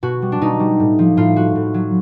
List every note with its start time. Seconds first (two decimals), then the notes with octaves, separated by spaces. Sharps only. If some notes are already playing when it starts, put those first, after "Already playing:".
0.03 B2 F#4
0.22 G3
0.32 D4
0.41 B2 D#4
0.60 G3
0.80 A2
0.99 F3
1.17 A2 F4
1.36 F3 F#4
1.55 A2
1.74 F#3